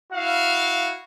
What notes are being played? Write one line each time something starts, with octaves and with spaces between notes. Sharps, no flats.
E4 F#4 F5